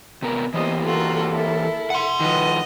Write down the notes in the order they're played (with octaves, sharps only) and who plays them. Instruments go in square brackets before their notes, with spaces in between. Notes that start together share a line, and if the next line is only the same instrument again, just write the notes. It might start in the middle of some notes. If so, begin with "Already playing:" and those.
[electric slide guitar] C3 B3 A#4
[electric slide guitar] E3 A#3 G4 [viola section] B3 D#5 [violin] C5
[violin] F4 F#4 [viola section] A4 A#4
[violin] E4
[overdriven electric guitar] F#5 C6
[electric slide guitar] D#3 F3 [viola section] B4 [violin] D#5